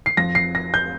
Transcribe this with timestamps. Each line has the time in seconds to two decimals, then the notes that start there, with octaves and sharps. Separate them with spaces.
0.06 C7
0.17 F2 F3 A#6
0.35 C7
0.55 A#6
0.74 G6